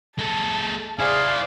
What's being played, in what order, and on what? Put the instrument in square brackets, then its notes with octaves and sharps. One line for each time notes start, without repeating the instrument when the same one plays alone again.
[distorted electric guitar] G#3 A4 [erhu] A5
[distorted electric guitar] E4 C5 [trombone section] G#4 [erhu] D5 [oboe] F5